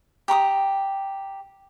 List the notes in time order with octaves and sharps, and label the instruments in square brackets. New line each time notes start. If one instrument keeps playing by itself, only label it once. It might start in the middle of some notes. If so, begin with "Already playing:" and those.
[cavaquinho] G4 A#5 C#6 D#6